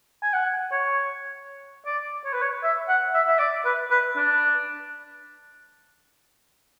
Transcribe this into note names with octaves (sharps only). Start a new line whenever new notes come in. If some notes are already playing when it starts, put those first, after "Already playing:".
G#5
F#5
C#5
D5
C#5
B4
C#5
E5
F#5
E5
E5
D5
B4
B4
D4